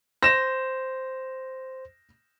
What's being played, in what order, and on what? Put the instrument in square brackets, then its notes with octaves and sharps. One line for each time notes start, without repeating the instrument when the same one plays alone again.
[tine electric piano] C5 [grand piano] A#6 E7